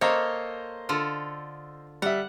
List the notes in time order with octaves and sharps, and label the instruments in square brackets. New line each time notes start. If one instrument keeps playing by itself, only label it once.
[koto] A#3 A4 C#5 [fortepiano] C5 D#5 F5
[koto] D3 F4 A4
[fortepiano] G3 E5 [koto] F#5